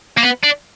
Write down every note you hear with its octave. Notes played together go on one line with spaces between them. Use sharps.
A#3
B3
D4